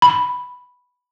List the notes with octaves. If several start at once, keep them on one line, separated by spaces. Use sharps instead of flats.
B5